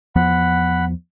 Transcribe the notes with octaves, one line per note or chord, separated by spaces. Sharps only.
E2 F3 B3 F#5 B5